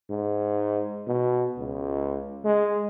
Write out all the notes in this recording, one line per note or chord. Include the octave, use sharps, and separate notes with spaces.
G#2
B2
C#2
G#3